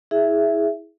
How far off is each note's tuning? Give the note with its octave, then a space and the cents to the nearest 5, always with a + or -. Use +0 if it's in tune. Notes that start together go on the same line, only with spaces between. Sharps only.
E4 -20 G#4 +0 E5 +10